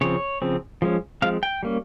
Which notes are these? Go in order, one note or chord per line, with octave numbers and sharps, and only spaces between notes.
C#3 F3 C4 C#5
C#3 F3 C4
F3 G#3 C#4
F3 G#3 C4 F5
G5
G3 A#3 C#4